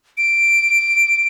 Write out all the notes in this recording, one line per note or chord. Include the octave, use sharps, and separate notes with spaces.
D7